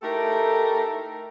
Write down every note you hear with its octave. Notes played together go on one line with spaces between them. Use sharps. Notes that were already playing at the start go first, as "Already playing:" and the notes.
A3 D#4 E4 G4 A4 A#4